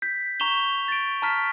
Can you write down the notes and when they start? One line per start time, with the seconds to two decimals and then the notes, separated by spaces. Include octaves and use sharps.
0.02 G6 B6
0.40 A#5 C#6 E7 F7 G7
0.88 A6 D7
1.22 A5 A#5 F6 B6